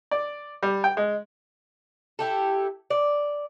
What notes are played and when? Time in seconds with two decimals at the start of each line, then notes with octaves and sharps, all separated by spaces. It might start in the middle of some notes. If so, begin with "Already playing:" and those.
0.11 D5
0.63 G3
0.84 G5
0.97 G#3
2.19 E4 G4 A4
2.90 D5